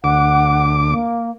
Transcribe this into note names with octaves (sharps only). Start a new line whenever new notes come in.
D2 F#5 D6
A#3